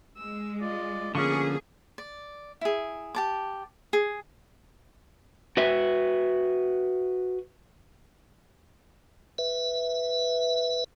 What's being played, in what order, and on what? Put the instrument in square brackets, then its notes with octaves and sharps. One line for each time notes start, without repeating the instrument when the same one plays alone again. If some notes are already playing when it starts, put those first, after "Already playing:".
[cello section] G#3 [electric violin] E6
[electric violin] F4 D#5 [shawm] D5
[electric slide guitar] D3 F3 C#4 [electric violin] A#3 B3 [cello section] G#4 [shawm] C#6
[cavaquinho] D5
E4 G#4
G4 A5 D6
G#4
[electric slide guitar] F#4 B4 E5
[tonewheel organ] B4 E5